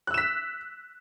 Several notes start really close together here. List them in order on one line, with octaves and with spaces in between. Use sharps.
F#6 E6 E7 B6